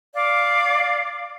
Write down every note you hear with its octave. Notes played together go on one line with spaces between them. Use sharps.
D5 F5